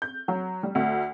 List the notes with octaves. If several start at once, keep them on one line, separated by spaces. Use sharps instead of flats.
G6
F#3
G3
D2